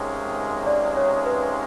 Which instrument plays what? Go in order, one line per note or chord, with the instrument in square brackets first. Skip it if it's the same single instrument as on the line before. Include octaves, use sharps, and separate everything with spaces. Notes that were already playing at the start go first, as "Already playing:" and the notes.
Already playing: [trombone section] C#2 C3 D#3 G#3 C#4 [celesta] C#5
[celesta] D5
C#5
B4